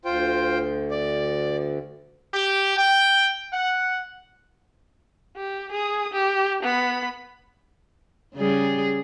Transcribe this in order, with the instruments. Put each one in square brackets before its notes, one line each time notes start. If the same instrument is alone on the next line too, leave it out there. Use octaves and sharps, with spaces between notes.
[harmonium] D2 [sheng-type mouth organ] F4 C5 G5
[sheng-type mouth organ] D5
[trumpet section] G4
G5
F#5
[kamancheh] G4
G#4 D#6
G4
B3 B5
[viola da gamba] C#3 G3 G#4